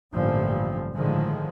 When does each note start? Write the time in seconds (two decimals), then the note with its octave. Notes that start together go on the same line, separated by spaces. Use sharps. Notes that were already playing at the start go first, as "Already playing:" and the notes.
0.13 A1 G2 A#2 D3 F3
0.95 A2 D3 D#3 F3 G#3